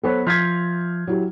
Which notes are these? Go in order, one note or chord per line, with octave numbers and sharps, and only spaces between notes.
F#3 B3 A4 C5 C#5
F3 F4 E5 F6 G#6
F#3 E4 G4